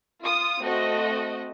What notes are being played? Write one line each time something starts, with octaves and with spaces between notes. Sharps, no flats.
F4 D#6
A3 C4 F#4 D#5